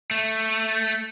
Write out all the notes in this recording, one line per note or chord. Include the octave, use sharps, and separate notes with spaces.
A3